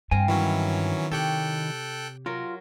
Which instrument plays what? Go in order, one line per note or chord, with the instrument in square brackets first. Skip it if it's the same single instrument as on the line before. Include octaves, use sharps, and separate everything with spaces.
[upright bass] G2 [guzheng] C4 F5 A#5 [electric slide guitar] G#5
[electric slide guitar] D#3 E4 [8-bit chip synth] E3 F#3 C#4
[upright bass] C3 [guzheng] G4 C#5 [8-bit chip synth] A4 G5 F#6
[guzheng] F#3 A#4 [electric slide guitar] F4